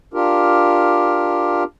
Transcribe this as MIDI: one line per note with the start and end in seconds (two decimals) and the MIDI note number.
0.14 1.64 62
0.14 1.64 65
0.14 1.64 67
0.14 1.64 70